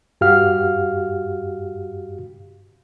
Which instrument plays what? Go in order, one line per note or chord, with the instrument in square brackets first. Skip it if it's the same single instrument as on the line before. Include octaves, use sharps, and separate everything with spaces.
[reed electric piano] G2 F#4 G4 F5 F6